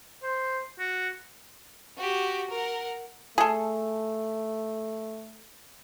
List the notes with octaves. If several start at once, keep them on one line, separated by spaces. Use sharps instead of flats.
C5
F#4
F#4 G4
A#4 F#5
A3 G#4 A4